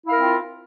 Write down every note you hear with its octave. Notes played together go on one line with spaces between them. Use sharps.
C4 E4 F4 A#4 F5